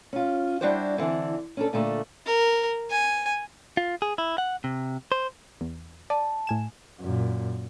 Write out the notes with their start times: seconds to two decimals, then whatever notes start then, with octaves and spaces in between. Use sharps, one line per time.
0.13 C#4 F4
0.61 G3 D4 E4 F#4 G4 C5
0.98 D3 E3 C4 D4
1.57 C#4 D4 A4
1.73 A#2 D3 A3 D4
2.26 A#4
2.90 G#5
3.77 F4
4.02 G#4
4.18 E4
4.38 F#5
4.64 C3
5.12 C5
5.61 E2
6.10 D5 A5
6.47 A2 G#5 E7
7.01 F#2 A#2